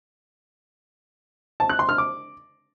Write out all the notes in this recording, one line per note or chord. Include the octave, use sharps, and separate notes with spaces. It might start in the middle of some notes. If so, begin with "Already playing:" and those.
A5
F#6
C6
F6
D6